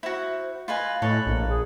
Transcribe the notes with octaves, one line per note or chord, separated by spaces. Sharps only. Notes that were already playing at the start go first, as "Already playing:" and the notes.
E4 F#4 C5
F4 B4 D#5 G#5
A2 A4 B4 C#5
A#1 A#3
G#4